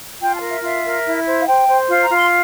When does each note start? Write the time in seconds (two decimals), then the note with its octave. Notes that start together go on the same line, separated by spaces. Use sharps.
0.20 F4 G5
0.35 A5
0.42 A#4
0.49 E5
0.63 F4 E5
0.84 A#4
1.05 E4
1.26 C5
1.42 F5
1.47 C5 G5
1.68 C5
1.90 F4
2.03 A#5
2.11 F4
2.17 C6